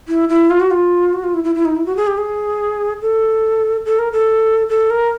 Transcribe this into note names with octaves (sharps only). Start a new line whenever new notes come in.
E4
E4
F4
F#4
F4
F#4
F4
E4
E4
E4
D#4
E4
F#4
G#4
G4
G#4
A4
A4
A#4
A4
A4
A#4